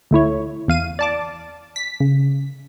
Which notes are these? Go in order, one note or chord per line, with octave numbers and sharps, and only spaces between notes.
D2 A3 E4 C#5
E2 F5 D#7
D5 A5 D6
B6
C#3